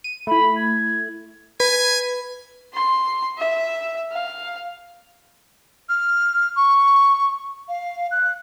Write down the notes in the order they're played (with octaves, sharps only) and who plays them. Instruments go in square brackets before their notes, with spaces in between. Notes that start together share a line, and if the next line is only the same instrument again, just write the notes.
[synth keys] D#7
[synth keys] A3 E4 [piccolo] B5
[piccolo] G#6
[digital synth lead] B4 [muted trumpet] G#5
[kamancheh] C6
E5
F5
[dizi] F6
C#6
F5
F#6